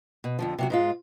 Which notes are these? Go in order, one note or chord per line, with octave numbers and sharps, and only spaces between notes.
B2
F2 D3 F3
C3 F#3 F#4
G#2 G#3 F4